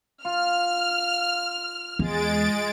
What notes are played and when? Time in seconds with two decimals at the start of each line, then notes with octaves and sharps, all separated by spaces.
0.25 F4 F6
1.99 E2 G#3 A6 D7